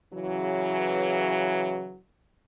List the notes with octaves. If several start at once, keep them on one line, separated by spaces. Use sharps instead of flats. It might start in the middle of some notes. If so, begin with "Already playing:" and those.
C#3 E3 F#3